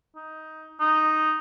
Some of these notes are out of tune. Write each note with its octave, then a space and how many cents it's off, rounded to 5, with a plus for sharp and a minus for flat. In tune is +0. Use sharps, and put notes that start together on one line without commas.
D#4 +10
D#4 -5